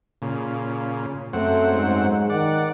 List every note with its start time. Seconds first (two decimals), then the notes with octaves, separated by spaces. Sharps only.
0.22 A#2 C#3
1.33 F#2 A3 C4 F#5
1.73 G#2
2.30 D#3 D5 F#5